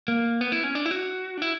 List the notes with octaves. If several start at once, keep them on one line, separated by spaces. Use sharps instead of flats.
A#3
B3
E4
C#4
D4
E4
F#4
D4
E4